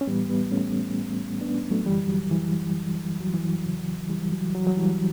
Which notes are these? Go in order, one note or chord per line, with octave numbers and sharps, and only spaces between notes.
C#4
A2 E3 G3 B3
G3 B3
A3 C#4
B3 D4
F#3 A3
F#2 D3 E3 G3
F#3
E3
F#3
E3
F#3
E2 C#3 E3
E3 G3
F#3
F#3
F#3
E3 G3